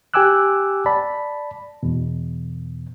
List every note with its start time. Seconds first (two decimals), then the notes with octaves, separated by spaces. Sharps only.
0.14 G4 G5 G#5 D6 E6 F#6
0.86 D5 A5 B5
1.83 E2 B2